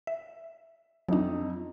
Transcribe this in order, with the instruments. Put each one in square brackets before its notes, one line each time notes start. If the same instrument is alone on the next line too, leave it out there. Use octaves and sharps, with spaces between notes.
[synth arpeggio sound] E5
[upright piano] F2 D#4 [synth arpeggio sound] F#3 D4